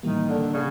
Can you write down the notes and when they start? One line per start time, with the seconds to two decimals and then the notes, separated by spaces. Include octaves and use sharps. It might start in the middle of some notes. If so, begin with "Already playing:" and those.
0.03 A2 D#3 E3 G3 A#3
0.29 D3
0.54 C#3